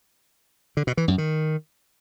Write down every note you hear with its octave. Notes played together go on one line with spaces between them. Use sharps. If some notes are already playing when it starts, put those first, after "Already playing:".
D3
B2
E3
F#2
D#3